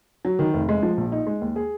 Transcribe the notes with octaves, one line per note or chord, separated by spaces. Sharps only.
F#3
D#3
F1
G#3
F3
A#1
D#4
G#3
D#2
G#4